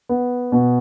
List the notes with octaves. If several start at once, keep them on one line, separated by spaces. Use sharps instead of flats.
B3
B2